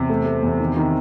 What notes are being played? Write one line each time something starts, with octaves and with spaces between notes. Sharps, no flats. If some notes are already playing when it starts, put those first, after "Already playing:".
Already playing: E2 C3
A3
A3
E2
D#3
D#3